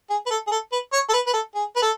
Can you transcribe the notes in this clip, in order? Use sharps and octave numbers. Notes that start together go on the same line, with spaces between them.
G#4
B4
A4
G#4
A4
B4
C#5
A4
B4
B4
A4
G#4
B4
A4